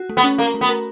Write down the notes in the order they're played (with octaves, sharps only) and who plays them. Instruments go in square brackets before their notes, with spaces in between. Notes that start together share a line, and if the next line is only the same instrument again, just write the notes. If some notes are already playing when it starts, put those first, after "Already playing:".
Already playing: [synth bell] F#4
A3
[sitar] B3
[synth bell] C#4
[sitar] A#3 [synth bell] A#4
[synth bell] A3
[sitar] B3
[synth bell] A#4